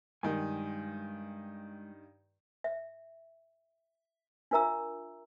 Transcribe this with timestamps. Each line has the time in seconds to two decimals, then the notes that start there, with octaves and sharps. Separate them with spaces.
0.23 G2 D#3 G#3 G#5
2.64 E5
4.51 D4 F4 A#4 E5 A#5 E6